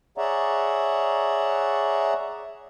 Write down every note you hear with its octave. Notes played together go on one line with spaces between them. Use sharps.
G#4 C#5 D5 E5 F#5 A#5